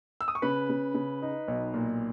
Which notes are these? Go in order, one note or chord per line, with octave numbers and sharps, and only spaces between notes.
E6
D#6
C#6
C#3 B4 B5
C#3
C#3
D#4
B1
A#2